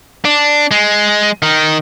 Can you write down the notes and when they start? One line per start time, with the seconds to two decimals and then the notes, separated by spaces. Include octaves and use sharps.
0.25 D4
0.71 G#3
1.42 D#3